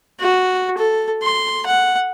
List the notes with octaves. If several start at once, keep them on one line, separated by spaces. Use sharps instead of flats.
F#4
A4
C6
F#5